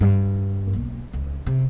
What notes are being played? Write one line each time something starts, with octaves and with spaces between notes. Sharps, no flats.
G2
B1 A#3
C#2
C3